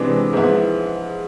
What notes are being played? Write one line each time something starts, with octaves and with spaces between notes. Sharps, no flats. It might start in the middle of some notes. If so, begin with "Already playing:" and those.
Already playing: C3 E3 G#3 B3 D4
G#2 F3 B3 E4